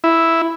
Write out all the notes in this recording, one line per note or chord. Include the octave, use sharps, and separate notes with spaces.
E4